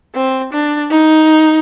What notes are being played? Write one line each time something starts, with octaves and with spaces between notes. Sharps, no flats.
C4
D4
D#4